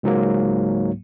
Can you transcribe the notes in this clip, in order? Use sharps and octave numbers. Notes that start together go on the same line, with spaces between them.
C#2 G#2 F#3 A#3